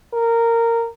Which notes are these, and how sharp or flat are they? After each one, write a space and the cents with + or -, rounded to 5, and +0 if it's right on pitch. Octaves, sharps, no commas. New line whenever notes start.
A#4 -15